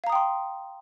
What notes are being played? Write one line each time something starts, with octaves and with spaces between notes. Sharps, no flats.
F5 G5 A#5 C6 D#6